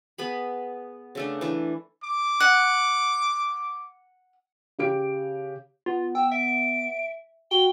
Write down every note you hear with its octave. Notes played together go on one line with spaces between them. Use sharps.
B3 G#4 B5
C#3 A3 D4
E3 D4
D6
F#5
C#3 G4 D7
B3 F4
G5 E6
E5 D7
F#4 G5 G7